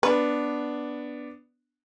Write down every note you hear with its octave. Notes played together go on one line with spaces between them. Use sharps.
B3 D4 B4